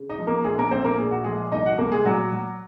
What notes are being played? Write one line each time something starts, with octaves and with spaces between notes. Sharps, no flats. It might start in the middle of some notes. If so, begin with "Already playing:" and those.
Already playing: C#3
D#4 D#5
F3
A#3 A#4
A#1 G#3 G#4
A#3 A#4
A#1 C4 C5
A#3 A#4
A#2 G#4
F#4
F3 G#3 G#4
C2 D#4 D#5
F#4 F#5
C2 A#3 A#4
G#3 G#4
A#2 F#3 F#4
F#3